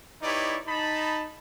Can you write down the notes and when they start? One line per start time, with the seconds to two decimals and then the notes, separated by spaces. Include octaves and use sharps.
0.22 D#4 E4 G4 B4 C#5 D5
0.67 D#4 A5 B5